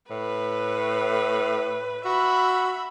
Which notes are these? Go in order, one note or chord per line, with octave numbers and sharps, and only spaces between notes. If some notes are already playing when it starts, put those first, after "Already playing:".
A2 B4
F#4 E5 B5